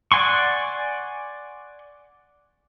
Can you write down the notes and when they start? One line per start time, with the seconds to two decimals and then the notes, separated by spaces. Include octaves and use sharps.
0.12 D5 F#5 G#5 C6 C#6